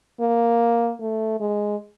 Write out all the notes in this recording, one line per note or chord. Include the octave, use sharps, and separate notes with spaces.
A#3
A3
G#3